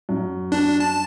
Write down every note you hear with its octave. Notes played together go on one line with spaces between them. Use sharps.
F#2
D4
A5